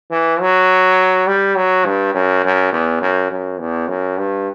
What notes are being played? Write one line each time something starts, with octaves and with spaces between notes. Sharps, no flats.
E3
F#3
G3
F#3
G2
F#2
F#2
E2
F#2
F#2
E2
F#2
G2